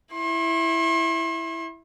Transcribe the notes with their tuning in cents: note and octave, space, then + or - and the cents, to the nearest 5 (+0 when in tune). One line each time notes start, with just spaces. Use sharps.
E4 +0 C6 +45